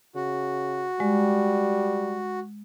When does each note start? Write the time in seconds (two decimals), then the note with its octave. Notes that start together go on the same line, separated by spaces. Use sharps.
0.15 C#3 F#4
1.00 G3 G#3